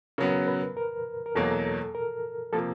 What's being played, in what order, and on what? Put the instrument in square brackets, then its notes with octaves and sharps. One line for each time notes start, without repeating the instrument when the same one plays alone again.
[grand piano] C#3 F#3 B3 [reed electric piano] A#4
[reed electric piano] B4
A#4
A#4
[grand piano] E2 B2 F#3 A#3 [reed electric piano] A4
[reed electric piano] A#4
[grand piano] C3 F3 A#3 [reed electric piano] A4